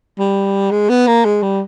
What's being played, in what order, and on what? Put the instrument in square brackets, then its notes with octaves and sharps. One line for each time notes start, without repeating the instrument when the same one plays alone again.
[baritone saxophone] G3
G#3
B3
A#3
G#3
G3